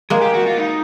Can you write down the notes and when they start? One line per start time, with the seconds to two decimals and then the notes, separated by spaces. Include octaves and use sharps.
0.10 G#3 A#3 G#4
0.22 G4
0.34 F#4
0.46 F4
0.58 D#4